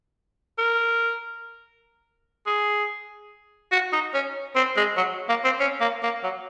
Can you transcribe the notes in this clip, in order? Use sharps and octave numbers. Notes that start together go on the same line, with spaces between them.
A#4
G#4
F#4
D#4
C#4
C4
G#3
F#3
A#3
C4
C#4
A#3
A#3
F#3